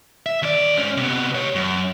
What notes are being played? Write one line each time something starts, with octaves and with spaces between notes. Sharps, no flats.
E5
D#2 D5
G#2 C#4
C3 B3
G4 C#5
F#2